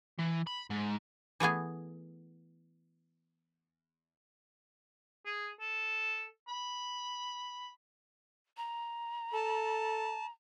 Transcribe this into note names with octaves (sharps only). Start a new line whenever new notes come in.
E3
B5
G#2
E3 A3 B3 G#4
G#4
A4
B5
A#5
A4 A5